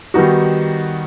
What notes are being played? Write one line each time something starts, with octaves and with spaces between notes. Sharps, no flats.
D#3 G3 B3 D#4 F#4